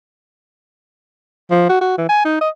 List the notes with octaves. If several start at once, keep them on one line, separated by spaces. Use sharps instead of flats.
F3
F#4
F#4
E3
G#5
D#4
D#5